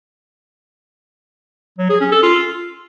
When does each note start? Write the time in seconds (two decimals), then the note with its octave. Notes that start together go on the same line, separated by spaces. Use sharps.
1.78 F#3
1.90 G#4
2.01 C#4
2.12 A4
2.23 F4